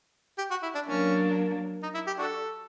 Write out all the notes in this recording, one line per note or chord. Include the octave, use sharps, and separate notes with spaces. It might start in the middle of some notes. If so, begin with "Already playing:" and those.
G4
F#4
E4
D4
F#3 A#3 C#4 D4
D#4
E4
G4
D4 F#4 A4